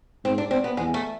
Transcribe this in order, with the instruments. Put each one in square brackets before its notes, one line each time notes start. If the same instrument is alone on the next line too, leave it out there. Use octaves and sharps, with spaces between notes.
[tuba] G#2 [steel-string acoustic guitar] C4
[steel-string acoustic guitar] D4
C4
B3
[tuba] E2 [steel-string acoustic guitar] G#3
[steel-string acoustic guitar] A3